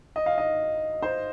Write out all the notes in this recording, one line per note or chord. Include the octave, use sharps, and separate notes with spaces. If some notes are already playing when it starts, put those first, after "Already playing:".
D#5
F5
D#5
C5